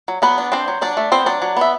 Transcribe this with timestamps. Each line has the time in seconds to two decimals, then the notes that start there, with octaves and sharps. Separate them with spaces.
0.08 F#3
0.22 F#3 B3 B4
0.38 D4
0.52 C4 D4 C5
0.68 F#3
0.81 F#3 D4 D5
0.97 A3
1.12 B3 C4 C5
1.26 F#3 D4 D5
1.42 F#3
1.57 B3 E5